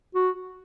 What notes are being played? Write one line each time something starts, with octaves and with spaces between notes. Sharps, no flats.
F#4